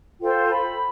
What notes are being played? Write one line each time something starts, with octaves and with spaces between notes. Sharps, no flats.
F4 A4 C5 G5
B5